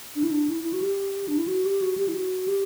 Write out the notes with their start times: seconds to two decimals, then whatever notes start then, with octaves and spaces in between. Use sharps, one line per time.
0.16 D4
0.23 E4
0.31 D4
0.49 E4
0.64 E4
0.73 F#4
0.82 G4
1.28 D4
1.38 E4
1.48 F#4
1.65 G4
1.82 F#4
1.98 G4
2.08 E4
2.15 F#4
2.48 G4